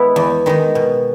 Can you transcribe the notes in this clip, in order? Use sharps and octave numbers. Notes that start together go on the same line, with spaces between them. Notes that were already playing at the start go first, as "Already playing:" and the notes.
Already playing: G#3 B3 E4
E2
D#3 G#3 D#4
B2